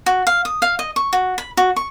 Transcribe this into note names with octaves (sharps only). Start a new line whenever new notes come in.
F#4
F5
D#6
F5
D#5
C#6
F#4
B5
F#4
C#6